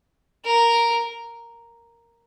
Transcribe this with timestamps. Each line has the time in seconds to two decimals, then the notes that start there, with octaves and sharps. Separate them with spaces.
0.45 A#4